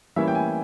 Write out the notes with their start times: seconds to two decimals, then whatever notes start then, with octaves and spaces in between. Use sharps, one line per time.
0.16 E3 G3 A#3 C#4 E4 E5
0.28 G5
0.35 G#5